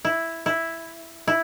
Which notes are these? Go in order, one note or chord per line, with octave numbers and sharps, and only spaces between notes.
E4
E4
E4